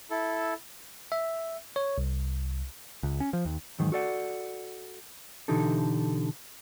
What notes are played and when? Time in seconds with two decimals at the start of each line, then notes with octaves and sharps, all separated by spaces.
0.10 E4 A4
1.12 E5
1.76 C#5
1.98 C2
3.03 C#2
3.20 C#4
3.33 F3
3.45 D#2
3.79 E2 G#2 D#3 F#3
3.92 F#4 A4 D5 F#5
5.48 B2 D3 E3 D#4 G4 A4